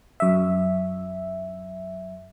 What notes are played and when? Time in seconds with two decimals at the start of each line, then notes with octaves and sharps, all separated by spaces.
0.20 F#2 E5